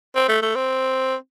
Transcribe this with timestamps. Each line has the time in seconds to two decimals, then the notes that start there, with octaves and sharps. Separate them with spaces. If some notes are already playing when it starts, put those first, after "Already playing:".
0.16 C4
0.28 A3
0.42 A3
0.55 C4